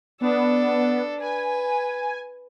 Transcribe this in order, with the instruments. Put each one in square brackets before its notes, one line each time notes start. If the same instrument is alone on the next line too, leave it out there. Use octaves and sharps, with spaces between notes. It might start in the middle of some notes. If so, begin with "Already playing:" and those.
[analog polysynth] B3 [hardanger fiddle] D4 A4
[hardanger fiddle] B4 [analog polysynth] G#5